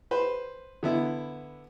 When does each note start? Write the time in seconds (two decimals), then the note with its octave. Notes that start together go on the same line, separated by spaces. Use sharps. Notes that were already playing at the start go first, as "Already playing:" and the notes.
0.11 B4 C5
0.83 D3 B3 E4